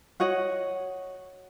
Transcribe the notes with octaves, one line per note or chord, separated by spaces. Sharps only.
F#4 C#5 D#5 F#5